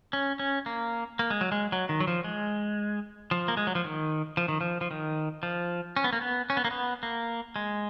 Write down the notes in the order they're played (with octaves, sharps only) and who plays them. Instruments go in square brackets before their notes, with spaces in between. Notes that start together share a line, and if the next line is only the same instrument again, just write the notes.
[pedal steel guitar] C#4
C#4
A#3
A#3
G#3
F#3
G#3
F#3
D#3
F#3
F3
G#3
F3
A#3
G#3
F#3
F3
D#3
F3
D#3
F3
F3
D#3
F3
C#4
B3
A#3
B3
C#4
B3
A#3
B3
A#3
G#3